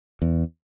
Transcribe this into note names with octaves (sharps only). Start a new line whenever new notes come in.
E2